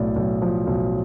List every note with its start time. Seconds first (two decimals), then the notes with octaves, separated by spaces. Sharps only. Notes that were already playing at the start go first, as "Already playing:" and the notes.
Already playing: B1 A2 D5
0.16 B1
0.42 F3
0.67 B1